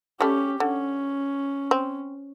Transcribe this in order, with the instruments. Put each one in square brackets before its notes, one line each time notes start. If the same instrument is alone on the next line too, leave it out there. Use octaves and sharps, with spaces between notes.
[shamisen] G3 A3 [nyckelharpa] C#4 G4
[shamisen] D3 [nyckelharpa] C#4
[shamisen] C4